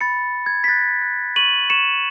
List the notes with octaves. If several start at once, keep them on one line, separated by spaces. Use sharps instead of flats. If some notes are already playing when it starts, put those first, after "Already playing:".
B5 A6 C#7
B5
G#6
B6
F#6 A6
F#6
C#6 D#7 F#7
C#6 C#7 E7